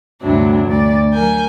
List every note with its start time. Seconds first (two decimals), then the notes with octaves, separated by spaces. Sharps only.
0.21 D2 G2 C3 F#3 D4 E4
0.63 D2 D5
1.13 F#3 A#4 G#5 G6